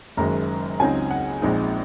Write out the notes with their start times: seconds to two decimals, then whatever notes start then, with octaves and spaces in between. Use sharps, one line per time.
0.17 F#1 F#2 D#3 G#3 A#5
0.80 C#2 C#3 F#3 C4 D#4 G#5
1.11 F#5
1.42 A#1 A#2 G#3 C4 D#4